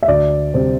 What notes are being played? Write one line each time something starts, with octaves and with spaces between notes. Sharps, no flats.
E5
D2 D5
C3 G3 C4